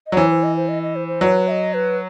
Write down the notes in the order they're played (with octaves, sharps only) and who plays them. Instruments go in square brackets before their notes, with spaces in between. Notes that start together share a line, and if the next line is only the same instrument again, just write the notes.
[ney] D#5
[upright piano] F#3
[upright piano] E3 [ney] C5
[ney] C5
D#5
C5
D#5
D#5
C5
C5
[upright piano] F#3 [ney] B4
[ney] E5
D#5
B4